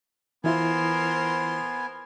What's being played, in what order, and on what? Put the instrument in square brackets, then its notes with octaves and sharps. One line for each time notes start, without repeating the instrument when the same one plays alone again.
[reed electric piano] E3 E4 F4 [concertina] B3 G#5 [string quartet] A#4 C5 C6